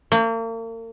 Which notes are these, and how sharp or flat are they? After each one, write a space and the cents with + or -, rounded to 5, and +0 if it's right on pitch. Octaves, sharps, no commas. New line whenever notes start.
A#3 -40